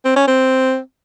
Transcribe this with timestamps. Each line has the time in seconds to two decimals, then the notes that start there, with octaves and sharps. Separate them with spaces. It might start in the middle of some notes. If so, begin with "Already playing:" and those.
0.05 C4
0.16 C#4
0.27 C4